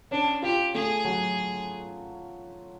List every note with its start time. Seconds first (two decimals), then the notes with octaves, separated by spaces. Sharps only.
0.11 C#4 D4
0.43 F4 G4
0.75 A3 G#4
1.05 F#3